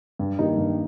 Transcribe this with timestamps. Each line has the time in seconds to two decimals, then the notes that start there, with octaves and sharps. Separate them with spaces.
0.19 G2
0.39 D#3 A#3 D#4 G4
0.57 G2